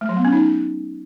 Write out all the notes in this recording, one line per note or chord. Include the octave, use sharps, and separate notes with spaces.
A3
F#3
B3
C#4
D#4